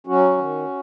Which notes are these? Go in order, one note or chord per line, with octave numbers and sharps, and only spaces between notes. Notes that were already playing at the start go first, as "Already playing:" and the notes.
F#3 C#4 F#4
D#3